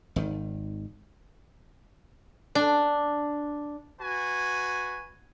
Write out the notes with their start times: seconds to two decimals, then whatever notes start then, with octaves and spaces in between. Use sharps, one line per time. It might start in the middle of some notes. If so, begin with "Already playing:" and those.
0.16 G#1 D#3
2.55 D4
4.00 F#4 B4 G#5